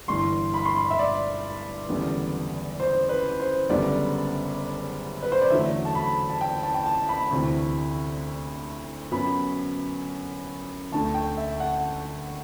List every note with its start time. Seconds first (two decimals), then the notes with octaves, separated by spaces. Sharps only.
0.08 G1 G2 E3 C6
0.54 B5
0.65 C6
0.77 B5
0.90 E5
0.99 D5
1.89 F#1 E2 D3 G3 B3
2.80 C5
3.09 B4
3.40 C5
3.69 F#1 F#2 D3 G3 B3 D5
5.23 B4
5.32 C5
5.41 D5
5.50 E2 D3 F#3 A3 E5
5.85 A5
5.95 B5
6.30 A5
6.41 G5
6.63 A5
6.74 G5
6.86 A5
7.09 B5
7.31 D2 C3 E3
9.11 F#2 F#3 B3 B5
10.92 D2 D3 A3 A5
11.14 G5
11.37 E5
11.60 F#5